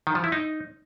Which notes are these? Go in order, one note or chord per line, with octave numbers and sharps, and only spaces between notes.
D#3
F3
E4
D#4